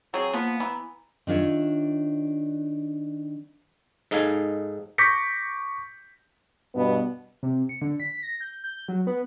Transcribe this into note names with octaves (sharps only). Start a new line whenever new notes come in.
F#3 C4 G#4
F3 A#3 B3
E3 A#5
D#3 D4 F4 C#5 E5
G#2 D#4 A4 F5 G#5
C#6 D6 G6 A#6 B6 C#7
G2 B2 B3
C3
C#7
D3
B6
A#6
G6
G6
F#3
B3